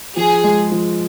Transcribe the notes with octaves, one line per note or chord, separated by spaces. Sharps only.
F3 G#4
G#3
F3